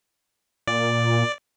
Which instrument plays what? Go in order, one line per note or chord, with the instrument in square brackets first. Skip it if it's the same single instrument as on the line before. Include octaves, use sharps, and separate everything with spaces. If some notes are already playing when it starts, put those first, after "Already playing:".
[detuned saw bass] A#2 [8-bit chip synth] D5